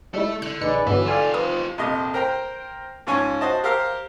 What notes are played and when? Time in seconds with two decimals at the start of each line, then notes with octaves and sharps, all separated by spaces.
0.14 G3 G#3 E4 A4 E5
0.42 D3 F#6
0.61 A#1 D#4 G#4 B4 D5 C#7
0.87 G2 D3 E3 F#3 B3 B4 E5
1.06 F4 G4 A4 D5 F5 G#5 E6
1.34 F3 B4 D#6
1.78 A#1 F2 C3 G4 D#5
2.14 A#4 C5 G5 A#5
3.07 G#2 F3 C#4 C#5 G#5 C#6
3.41 F#4 C5 D#5 A5
3.64 G4 A#4 C5 F5 F6